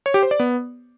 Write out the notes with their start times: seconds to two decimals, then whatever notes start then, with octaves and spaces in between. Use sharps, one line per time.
0.06 C#5
0.14 G4
0.23 C5
0.31 D5
0.40 B3